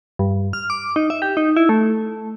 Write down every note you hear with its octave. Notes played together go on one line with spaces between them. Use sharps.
G2
F6
D6
D#4
E5
G4
D#4
E4
A3